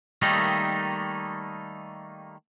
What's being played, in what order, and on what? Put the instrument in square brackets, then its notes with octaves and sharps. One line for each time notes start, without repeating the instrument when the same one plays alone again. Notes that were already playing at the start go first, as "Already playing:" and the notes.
[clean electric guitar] D#3 G3 A3 A#3 D#4